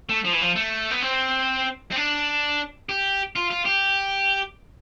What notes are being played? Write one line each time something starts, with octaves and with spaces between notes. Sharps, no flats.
A3
F3
E3
F3
A3
B3
C4
C4
D4
G4
F4
F4
G4